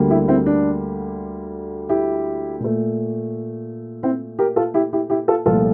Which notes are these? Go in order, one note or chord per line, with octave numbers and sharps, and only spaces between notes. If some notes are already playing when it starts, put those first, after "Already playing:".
Already playing: D2 D3 G3 A#3
E4 G4
C4 E4
D4
E4 G4
A#2 A3
C4 E4
G4 A#4
F4 A4
E4 G4
E4 G4
E4 G4
F4 A4
C2 A#2 F3 A3 F4 A4